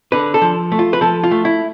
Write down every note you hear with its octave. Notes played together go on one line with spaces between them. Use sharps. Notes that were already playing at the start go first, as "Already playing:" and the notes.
D3 B4
A4
F3
A3
F4
B4
F3 A4
F4
A3
E4